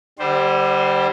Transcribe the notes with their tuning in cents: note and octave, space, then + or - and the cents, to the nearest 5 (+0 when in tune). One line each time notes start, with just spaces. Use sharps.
D3 +35 G3 +0 C5 +0